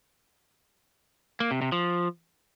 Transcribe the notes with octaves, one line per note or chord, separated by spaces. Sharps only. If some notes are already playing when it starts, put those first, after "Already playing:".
A#3
C3
C3
F3